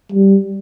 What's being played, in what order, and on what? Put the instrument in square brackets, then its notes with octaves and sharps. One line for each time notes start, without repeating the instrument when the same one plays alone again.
[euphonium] G3